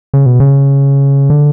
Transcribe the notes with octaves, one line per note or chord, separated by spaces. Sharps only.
C#3
B2
C#3
D3